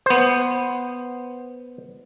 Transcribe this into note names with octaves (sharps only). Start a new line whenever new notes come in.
B3 C5